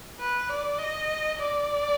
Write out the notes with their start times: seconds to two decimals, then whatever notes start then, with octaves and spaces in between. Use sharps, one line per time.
0.19 B4
0.49 D5
0.78 D#5
1.38 D5